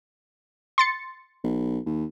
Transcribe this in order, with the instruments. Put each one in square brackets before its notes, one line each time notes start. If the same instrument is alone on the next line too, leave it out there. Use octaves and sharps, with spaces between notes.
[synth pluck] C6 A6 C#7
[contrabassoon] B1
D#2